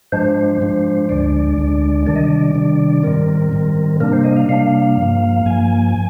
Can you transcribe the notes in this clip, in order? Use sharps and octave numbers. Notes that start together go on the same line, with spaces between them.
G#2 F3 G#3 D4 C5
G#2 F3 G#3 D4
D2 D3 G#3 D4 D5
D2 D3 G#3 D4
C3 D#3 G3 D4 D5
D#5
D5
C3 D#3 G3 D4
G#2 D#3 G3 C4 A#4
G#2 D#3 G3 C4
C3 G3 A#3 D4 A#4
C5
D#5
F5
C3 G3 A#3 D4 F5
G2 F3 A#3
G2 F3 A#3 G#5